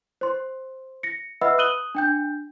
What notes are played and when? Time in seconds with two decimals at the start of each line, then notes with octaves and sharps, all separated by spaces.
0.21 C5 C6
1.03 A#6 C#7
1.41 B4 D#5 E5 F#5 B5 E6
1.58 D#6 F#6 D#7 F#7 G7
1.95 D4 G5 G6